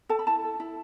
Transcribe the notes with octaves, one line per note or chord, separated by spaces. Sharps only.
A4 A5
B5
E4 A5
A4
E4